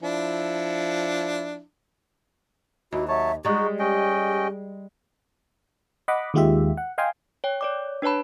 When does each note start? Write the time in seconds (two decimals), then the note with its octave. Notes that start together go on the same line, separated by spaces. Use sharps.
0.02 F3 D4 E4
2.92 D#2 E4 F#4
3.08 F#3 C#5 E5 A5
3.45 G3 G#3 D#4 F#4 G#4
3.79 C#4 G4 D#5 G5
6.08 D#5 F#5 B5 D6
6.34 D#2 D#3 G#3 F4 G4 E5
6.77 F#5
6.98 D#5 F5 G5 G#5 C6 D#6
7.44 C#5 G5
7.61 C#5 D5 D6
8.02 D4 B4 C#5 A5 B5